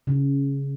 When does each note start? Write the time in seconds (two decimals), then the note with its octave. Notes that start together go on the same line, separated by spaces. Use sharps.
0.07 C#3